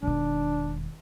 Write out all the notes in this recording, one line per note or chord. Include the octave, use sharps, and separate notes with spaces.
E1 D#3 D4